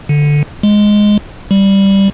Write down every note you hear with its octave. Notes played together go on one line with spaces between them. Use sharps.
D3
G#3
G3